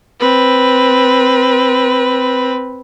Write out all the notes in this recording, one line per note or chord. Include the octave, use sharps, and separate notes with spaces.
C4 B4